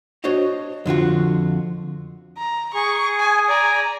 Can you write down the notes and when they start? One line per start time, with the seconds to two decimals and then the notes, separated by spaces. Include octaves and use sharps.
0.24 D4 F#4 C5 C#5 D#5
0.86 F2 D3 F4 F#4
2.38 A#5
2.74 G#4 C#6
3.19 G#5
3.49 D5 G#5 A#5